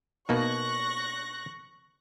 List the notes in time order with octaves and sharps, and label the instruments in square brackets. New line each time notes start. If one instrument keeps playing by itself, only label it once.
[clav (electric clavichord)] B2 A#3 D#4 [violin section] C#6 F#6 A#6